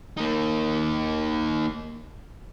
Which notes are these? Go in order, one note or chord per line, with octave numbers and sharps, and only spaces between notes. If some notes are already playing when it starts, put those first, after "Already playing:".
A#3 D#4